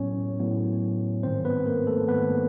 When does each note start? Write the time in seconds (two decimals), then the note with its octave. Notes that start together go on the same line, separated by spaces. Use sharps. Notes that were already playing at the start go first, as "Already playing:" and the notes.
Already playing: A2 F#3 B3 C#4 C#5
0.39 A2 F#3 B3
1.23 G#2 D#3 G3 C4 C5
1.45 B3 B4
1.66 A#3 A#4
1.87 A3 A4
2.08 G#2 D#3 G3 B3 B4